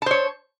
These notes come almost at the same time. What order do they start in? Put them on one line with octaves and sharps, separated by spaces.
A5 C5 C#5